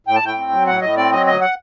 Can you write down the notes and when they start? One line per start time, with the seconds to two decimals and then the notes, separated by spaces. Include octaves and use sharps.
0.07 A2 G5
0.16 A5
0.22 A2 G5
0.37 C4
0.52 F#3
0.66 A2 F#5
0.81 A2 D#5
0.97 C4 D5
1.12 F#3 D#5
1.26 D2 D#5
1.41 F#5